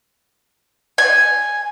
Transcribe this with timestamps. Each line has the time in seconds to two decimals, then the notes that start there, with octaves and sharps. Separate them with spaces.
0.98 G#5